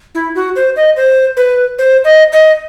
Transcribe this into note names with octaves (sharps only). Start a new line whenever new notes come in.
E4
F#4
C5
D#5
C5
B4
C5
D#5
D#5